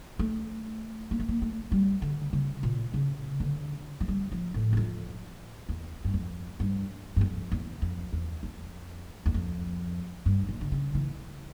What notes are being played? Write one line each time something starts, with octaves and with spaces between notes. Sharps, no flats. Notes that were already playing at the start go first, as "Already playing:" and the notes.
A3
A#3
A3
A#3
A3
G3
D3
C#3
A#2
C#3
D3
F3
G3
F3
A2
G2
F2
E2
G2
F2
G2
G2
F2
E2
F2
E2
F2
E2
F2
G2
A#2
D3
C#3
E3